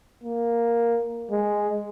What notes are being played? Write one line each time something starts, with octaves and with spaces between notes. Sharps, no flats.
A#3
G#3